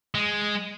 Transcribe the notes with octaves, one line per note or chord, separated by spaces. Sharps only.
G#3